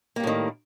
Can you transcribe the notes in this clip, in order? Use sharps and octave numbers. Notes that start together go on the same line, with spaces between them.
A2 D#3 G3 A#3